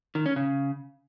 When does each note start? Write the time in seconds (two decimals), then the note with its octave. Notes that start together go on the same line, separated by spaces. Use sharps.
0.15 D#3
0.26 C#4
0.36 C#3